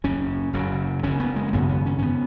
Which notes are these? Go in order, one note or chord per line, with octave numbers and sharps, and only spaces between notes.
F#1 F#2 C#3 C#4
F#1 F#2 C#3
F#1 F#2 C#3 C#4
B3
G#3
G#1 F#2 C#3 B3
B3
C#4
C#4
C#3 B3